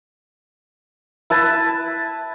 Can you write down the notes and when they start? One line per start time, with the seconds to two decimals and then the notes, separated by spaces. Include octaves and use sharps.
1.30 E4 B4 A5